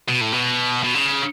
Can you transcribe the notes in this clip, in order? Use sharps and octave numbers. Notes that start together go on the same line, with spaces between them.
B2
A2
B2
B2
C#3